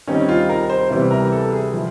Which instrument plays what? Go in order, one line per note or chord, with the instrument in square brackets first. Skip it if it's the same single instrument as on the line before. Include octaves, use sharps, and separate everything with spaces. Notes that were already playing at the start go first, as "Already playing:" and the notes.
[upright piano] D#3 G3 C4 D#4 [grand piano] C#4
[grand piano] F4
A#4
C5
[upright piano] C3 E3 G3 B3 E4
[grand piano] A#4
A4
G#4
[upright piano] F3